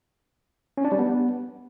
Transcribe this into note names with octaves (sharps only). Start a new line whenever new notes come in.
C#4
D4
G3
B3